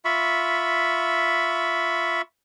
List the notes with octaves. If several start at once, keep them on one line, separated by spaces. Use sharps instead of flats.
F4 E5 B5 C#6